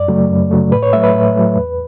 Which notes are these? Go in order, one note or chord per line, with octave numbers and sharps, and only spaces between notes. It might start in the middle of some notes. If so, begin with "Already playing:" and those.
Already playing: F#2 D5
C#3 F#3 A3
F#2
C#3 F#3 A3
A2 B4
C#5
F#3 A3 E5
B4
A2
F#3 A3
E2